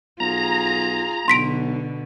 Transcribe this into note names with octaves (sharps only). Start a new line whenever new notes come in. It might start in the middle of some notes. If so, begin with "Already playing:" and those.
B1 F4 G#4 A#5
B1 B2 D3 C6 B6 D7